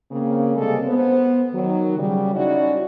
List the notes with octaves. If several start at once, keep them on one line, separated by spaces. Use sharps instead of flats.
C#3 A#3 C4
C3 G3 G#3 A#3 D4 A4
B3 C5
D#3 F#3
C#3 G3
C#4 D#4 E4 F#4 D5